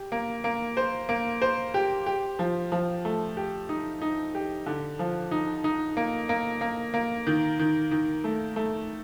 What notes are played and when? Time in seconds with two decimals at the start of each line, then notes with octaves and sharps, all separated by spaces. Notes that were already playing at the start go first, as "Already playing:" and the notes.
Already playing: G4
0.12 A#3
0.44 A#3
0.77 C5
1.09 A#3
1.42 C5
1.74 G4
2.06 G4
2.39 F3
2.72 F3
3.05 A3
3.37 G4
3.69 D#4
4.02 D#4
4.35 G4
4.66 D3
4.99 F3
5.31 D#4
5.64 D#4
5.97 A#3
6.29 A#3
6.61 A#3
6.94 A#3
7.27 D#3
7.59 D#3
7.91 D#3
8.24 A3
8.56 A3